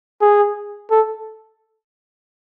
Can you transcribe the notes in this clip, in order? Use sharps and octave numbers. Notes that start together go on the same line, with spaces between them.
G#4
A4